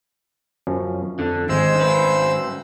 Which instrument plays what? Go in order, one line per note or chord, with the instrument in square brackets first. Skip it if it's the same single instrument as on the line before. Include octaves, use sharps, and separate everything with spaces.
[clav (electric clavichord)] F#2 F3 C#4
[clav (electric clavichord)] F2 [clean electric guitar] D3
[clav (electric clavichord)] G#1 [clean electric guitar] G#3 [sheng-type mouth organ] C5 E6
[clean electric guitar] F#2 B4